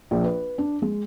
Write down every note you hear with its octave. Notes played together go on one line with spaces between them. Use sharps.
A#1
B4
D4
G#3